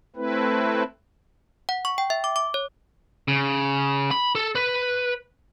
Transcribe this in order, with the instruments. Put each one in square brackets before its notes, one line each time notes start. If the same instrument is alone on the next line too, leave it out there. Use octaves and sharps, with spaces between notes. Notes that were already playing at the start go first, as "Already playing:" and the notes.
[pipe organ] A3 C4 E4 B4
[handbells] F#5
C#6
G5
E5
D6
D6
C#5
[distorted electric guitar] C#3
B5
A4
B4